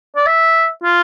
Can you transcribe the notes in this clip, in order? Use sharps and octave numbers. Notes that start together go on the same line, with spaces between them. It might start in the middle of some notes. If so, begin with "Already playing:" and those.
D5
E5
F4